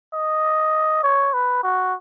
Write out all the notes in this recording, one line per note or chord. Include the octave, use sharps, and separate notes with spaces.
D#5
C#5
B4
F#4